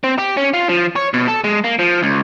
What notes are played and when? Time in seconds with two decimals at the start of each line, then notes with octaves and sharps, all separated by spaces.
0.04 C4
0.18 G4
0.37 C#4
0.53 F4
0.69 F3
0.96 C#5
1.14 B2
1.28 A4
1.44 G#3
1.64 A#3
1.79 F3
2.03 C#2